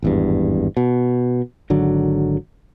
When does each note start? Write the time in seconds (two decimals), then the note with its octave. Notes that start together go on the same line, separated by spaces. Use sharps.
0.03 G#1 E2 G2
0.77 B2
1.70 G#1 D3 F#3